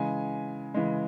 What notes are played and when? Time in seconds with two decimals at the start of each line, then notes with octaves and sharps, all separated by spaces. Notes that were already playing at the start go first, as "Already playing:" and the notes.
Already playing: C#3 E3 G#3 G#5
0.74 C#3 E3 G#3